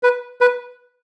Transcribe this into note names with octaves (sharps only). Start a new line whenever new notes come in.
B4
B4